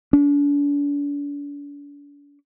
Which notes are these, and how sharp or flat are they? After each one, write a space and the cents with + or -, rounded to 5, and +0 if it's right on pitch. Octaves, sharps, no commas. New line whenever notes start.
D4 -40